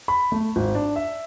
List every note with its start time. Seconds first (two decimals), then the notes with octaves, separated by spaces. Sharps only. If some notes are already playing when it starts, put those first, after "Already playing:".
0.08 B5
0.32 A3
0.56 G#1
0.75 D4
0.96 E5